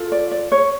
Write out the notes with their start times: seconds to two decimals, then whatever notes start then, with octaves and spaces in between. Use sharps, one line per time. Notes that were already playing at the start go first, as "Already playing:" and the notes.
Already playing: F4 A4
0.12 D5
0.31 D5
0.52 C#5